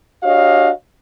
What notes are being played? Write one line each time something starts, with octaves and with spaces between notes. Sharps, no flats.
D4 F#4 G4 C#5 D#5 F5